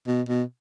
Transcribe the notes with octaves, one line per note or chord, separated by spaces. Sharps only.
B2
B2